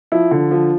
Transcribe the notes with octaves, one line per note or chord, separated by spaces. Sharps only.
F3 E4
D3
F3